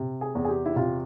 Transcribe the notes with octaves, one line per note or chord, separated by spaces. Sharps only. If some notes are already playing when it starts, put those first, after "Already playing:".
Already playing: C3
G#4
E2
G#4
G4
E4
C3 F4